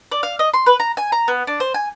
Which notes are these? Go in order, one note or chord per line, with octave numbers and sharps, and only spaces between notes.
D5
F5
D#5
C6
B4
A#5
G#5
A#5
B3
D4
C5
G#5